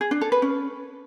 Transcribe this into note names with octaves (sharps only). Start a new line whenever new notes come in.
G#4
D4
A4
B4
C#4